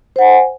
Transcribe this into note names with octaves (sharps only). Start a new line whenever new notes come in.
C5 F#5 G#5